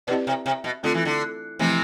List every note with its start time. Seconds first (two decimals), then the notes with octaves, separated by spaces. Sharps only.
0.07 B2 C4 E4 G4 B4 D5
0.27 C3
0.46 C3
0.64 B2
0.83 D3 A3 C4 F4 A4
0.94 E3
1.05 D3
1.59 C3 E3 F3 A3 C4